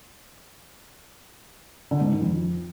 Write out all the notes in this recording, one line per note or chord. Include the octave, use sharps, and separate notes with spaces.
D3
G#2
D#3
F2